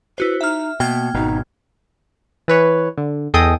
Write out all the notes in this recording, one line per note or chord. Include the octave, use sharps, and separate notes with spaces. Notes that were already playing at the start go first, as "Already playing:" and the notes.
E4 F#4 B4 C5
D#4 E5 F6
B2 A#3 G5 F6 G#6
G#1 B2 D#4
E3 B4 C#5
D3
E2 G#4 A4 D#5 G5 D#6